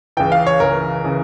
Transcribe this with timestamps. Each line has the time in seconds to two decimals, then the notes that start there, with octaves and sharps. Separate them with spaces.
0.17 C#2 C#3 E3 G5
0.32 F5
0.47 C#5
0.60 C#2 C#3 E3 A#4
1.04 C#3 E3